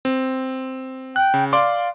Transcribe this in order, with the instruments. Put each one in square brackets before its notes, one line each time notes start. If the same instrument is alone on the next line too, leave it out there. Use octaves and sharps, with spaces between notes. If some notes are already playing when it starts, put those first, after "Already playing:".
[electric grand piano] C4
[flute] G5 [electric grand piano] F#6
[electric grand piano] C#3
[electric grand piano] D5 C6 D6 [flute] F5